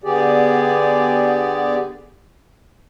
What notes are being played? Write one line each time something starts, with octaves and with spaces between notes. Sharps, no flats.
D3 B3 G4 G#4 D5